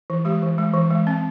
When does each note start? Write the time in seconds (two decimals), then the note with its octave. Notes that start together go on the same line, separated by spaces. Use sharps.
0.10 E3
0.25 G#3 G4
0.42 E3
0.58 G#3
0.74 E3
0.90 G#3
1.07 C4